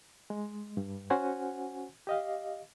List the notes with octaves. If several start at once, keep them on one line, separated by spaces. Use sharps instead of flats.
G#3
G2
C#4 F#4 C5 F#5 G#5
G4 D#5 F5